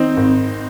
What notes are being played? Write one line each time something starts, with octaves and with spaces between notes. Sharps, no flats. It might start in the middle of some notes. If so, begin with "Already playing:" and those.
Already playing: D#3 C4 D#4
G#1